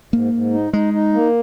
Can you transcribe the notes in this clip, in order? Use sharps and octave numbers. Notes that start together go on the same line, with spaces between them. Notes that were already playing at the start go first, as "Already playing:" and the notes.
G#2 A#3
G#2
D#4
G#3 D#4
D#4
A#3